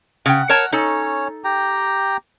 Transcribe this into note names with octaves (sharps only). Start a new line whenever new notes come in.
C#3 F#5 G5
A#4 C#5 A5
C#4 D#4 A4 C#5
G4 G5 A#5